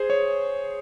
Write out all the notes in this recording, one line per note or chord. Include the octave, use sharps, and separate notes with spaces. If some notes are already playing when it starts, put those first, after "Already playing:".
Already playing: G#4 C5
C#5